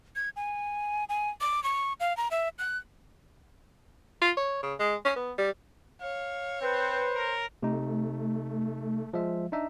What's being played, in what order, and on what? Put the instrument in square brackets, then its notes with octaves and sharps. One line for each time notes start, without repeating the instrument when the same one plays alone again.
[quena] G#6
G#5
G#5
D6
C#6
F5
A#5
E5
F#6
[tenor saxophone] F4
C#5
C#3
G#3
C#4
B3
G3
[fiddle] C#5 [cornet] F5
[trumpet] C4 [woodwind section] B4 [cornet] C5
[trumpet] A#4
[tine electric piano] C3 D#4 [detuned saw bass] A3
[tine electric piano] F3 G#3 E5
D4 D#4 E5